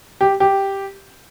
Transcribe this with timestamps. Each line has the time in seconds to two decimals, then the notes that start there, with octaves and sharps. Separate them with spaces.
0.21 G4
0.40 G4